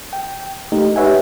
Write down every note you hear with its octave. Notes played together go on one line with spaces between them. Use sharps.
G5
A3 A#3 D#4 G4
G4 B4 C#5 E5 F#5 G#5